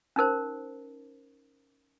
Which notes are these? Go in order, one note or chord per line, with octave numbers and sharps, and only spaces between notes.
C#4 D#4 A#4 C5